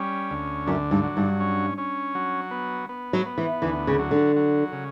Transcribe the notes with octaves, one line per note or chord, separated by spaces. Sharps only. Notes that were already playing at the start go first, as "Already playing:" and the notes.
Already playing: G3 C#4
D2
F#2 D3
G2
F#3
G2
C#4
C#4
F#3
B3
B3
F#3
B3
E3
D2 E3
C#3
F#3
D3
F#3
C#3